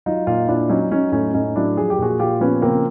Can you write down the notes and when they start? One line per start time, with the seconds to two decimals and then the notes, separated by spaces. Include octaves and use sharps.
0.06 F#3 D#4 F4
0.27 A#2 D#4 F4
0.48 A#2 D4 E4
0.69 F#3 C#4 D#4
0.91 F#3 C#4 D#4
1.12 A2 C#4 D#4
1.34 A2 C#4 D#4
1.56 F#3 D4 E4
1.77 F3 G#4
1.90 G4
1.98 A#2 F#4 G#4
2.19 A#2 F4 G4
2.40 F3 B3 C#4
2.62 C#3 A#3 C4